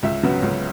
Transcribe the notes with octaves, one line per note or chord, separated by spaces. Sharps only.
C#2 E5
C#3 F#3 B3
C#2